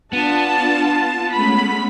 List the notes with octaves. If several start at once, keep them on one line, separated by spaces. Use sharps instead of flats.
B3 D4 F4 A5
G#3 A3 C#4 B5